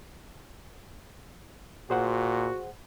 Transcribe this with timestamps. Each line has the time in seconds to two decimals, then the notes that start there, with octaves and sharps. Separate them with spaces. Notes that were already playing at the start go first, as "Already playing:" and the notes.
1.90 A#2 F#4 G#4 C5 F#5